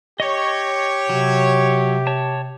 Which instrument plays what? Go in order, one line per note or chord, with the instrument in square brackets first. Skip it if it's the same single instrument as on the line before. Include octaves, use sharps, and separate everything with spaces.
[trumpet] G4 [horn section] C#5 [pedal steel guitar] D#5 C#6
[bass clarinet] C3 [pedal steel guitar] F#3
[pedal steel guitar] C#5 A5